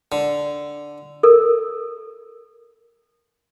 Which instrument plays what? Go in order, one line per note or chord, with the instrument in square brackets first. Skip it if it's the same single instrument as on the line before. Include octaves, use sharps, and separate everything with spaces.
[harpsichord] D3
[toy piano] A4 A#4